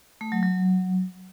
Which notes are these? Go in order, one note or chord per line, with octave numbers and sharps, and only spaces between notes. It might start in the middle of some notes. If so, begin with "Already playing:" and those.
A3
F#3
F#3